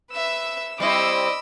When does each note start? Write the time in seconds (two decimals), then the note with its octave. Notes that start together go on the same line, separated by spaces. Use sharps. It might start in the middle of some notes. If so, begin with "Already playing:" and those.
0.12 B4 E5 E6
0.80 G3 C4 E4 D#5 B5 D6 E6